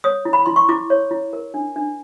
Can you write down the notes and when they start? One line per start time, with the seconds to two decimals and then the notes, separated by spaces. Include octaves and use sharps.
0.04 C#5 D#6
0.25 E4
0.33 B5
0.46 E4 C6
0.56 C#6
0.69 E4 D6
0.90 C#5
1.11 E4
1.33 A#4
1.54 D4
1.76 D4